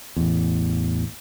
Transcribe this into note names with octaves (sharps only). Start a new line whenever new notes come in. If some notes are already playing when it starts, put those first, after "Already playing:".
A1 E2